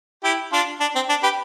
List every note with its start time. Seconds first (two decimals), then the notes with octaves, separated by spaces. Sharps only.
0.24 E4 G4
0.53 D4 F4
0.80 D4
0.95 C4
1.09 D4
1.23 G4 B4